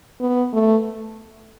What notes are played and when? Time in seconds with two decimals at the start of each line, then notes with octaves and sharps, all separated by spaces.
0.20 B3
0.53 A3